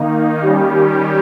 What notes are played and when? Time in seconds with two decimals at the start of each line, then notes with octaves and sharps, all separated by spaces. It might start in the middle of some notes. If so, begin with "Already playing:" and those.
Already playing: D#3 A#3 D#4
0.42 D#3 G3 C#4 G4